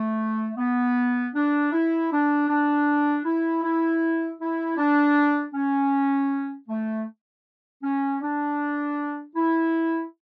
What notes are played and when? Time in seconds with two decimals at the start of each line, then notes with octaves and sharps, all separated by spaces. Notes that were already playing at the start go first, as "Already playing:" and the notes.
Already playing: A3
0.57 B3
1.34 D4
1.72 E4
2.11 D4
2.48 D4
3.24 E4
3.63 E4
4.40 E4
4.77 D4
5.54 C#4
6.68 A3
7.82 C#4
8.21 D4
9.35 E4